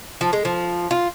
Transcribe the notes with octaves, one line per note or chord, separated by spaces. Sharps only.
F3
G#3
F3
F4